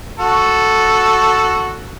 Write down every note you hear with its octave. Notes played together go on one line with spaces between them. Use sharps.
F#4 A4